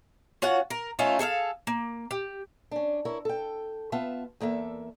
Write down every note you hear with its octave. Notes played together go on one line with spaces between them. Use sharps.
C#4 F4 F#4 F#5
A#4
A3 C#4 D#4 F4
G#4 A4 E5 F5
A#3
G4
C#4 D4
E4 A#4 C#5
A4 G5
B3 F4 E5 A5
E2 A#3 A4 E5